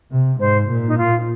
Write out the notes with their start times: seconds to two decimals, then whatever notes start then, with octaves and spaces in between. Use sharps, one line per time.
0.11 C3
0.39 G#2 C5
0.69 A#2
0.87 D#4
0.97 F4